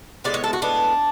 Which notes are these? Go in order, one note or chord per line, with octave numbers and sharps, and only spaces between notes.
A2 G#3 B3 D5
C#5
A4
F#4
A2 G#3 B3 D4